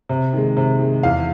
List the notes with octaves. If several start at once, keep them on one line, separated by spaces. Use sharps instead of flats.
C3
D#3 G#3
C3
D#3 G#3
E2 F5